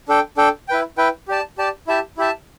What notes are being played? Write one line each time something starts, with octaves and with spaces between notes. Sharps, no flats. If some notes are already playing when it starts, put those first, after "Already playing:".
D4 A4 G5
D4 A4 G5
E4 B4 G5
E4 B4 G5
G4 D5 A5
G4 D5 A5
E4 G4 E5 A5
E4 G4 E5 A5